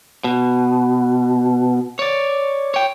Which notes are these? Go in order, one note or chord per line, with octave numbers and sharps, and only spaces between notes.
B2
C#5 D5
C#5 G5